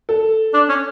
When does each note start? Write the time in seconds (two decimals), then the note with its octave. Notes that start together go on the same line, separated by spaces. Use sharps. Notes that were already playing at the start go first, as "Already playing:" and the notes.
0.09 A4
0.54 D4
0.69 C#4